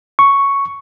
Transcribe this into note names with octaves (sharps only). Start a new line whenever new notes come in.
C#6